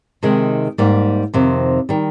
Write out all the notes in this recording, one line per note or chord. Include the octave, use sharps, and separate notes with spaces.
C3 D#3 G#3
G#2 G3 A#3
F2 C3 D#3
D#3 G3